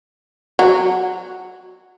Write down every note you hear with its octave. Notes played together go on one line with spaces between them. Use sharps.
F#3